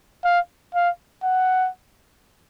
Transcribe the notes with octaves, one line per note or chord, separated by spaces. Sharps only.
F5
F5
F#5